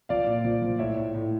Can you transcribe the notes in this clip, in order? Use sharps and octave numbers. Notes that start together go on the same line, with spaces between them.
F3 D5 F5
A#2
F3
F3
A2 C#5 E5
A2
A2